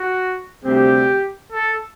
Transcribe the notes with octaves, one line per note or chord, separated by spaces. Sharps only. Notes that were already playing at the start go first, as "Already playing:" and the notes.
Already playing: F#4
D2 C3 G3 C4 G4
A4